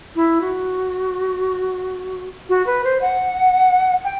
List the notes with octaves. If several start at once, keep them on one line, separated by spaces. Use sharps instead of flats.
E4
F#4
F#4
B4
C5
F#5
G5